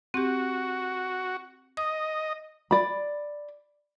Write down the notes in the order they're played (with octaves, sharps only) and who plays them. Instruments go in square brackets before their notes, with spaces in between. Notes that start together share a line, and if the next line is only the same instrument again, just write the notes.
[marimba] C4 G4 [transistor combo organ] F#4
[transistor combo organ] D#5 [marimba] D#6
[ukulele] D5 B5